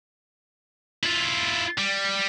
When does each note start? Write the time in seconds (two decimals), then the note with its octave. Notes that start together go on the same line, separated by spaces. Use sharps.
1.03 E4 F4
1.78 G3